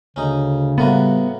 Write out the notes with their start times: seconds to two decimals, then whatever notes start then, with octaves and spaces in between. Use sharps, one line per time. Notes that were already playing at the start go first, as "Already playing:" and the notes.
0.16 D2 C#3 C#4 D#4
0.78 A2 G3 A#3 B3 F#4